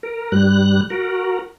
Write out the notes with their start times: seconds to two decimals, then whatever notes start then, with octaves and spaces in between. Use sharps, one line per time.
0.03 A#4
0.32 G2 G3 F#6
0.90 F#4 A#4